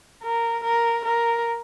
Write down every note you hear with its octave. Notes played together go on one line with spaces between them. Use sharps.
A#4
A#4
A#4